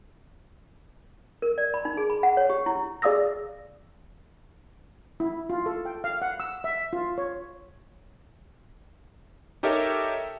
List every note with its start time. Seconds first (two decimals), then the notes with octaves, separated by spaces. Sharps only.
1.42 A#4
1.58 D5
1.74 B5
1.85 D#4
1.97 G#4
2.10 B5
2.23 F#5
2.37 C#5
2.50 G4
2.66 E4
3.02 G#4 D5 F5 D#6 E6 A#6
5.20 E4
5.50 F4
5.66 A4
5.85 G5
6.04 F5
6.22 F#5
6.40 E6
6.64 E5
6.93 F4
7.18 C#5
9.63 D#4 G4 A4 A#4 C#5 E5